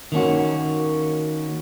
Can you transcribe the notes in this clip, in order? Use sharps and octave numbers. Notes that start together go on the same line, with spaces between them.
D#3 A#3 C#4 F#4